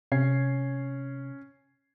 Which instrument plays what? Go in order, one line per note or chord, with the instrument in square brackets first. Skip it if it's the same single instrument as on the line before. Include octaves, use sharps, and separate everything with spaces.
[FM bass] C3 [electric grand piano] C#4 G#6 C7